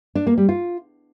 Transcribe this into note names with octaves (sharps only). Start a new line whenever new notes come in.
D4
A#3
G3
F4